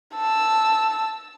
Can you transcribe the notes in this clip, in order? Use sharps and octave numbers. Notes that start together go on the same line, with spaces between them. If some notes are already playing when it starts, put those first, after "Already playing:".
A5 E6